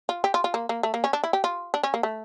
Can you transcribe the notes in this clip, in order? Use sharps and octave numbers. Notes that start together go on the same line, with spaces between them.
F4
G4
F4
F4
A#3
A#3
A3
A#3
C#4
D4
E4
G4
F4
D4
C#4
A#3
A3